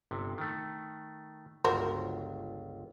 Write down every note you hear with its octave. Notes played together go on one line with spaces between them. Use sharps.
G1 C3
D#3 A3
G1 C#2 F#4 A#4 C5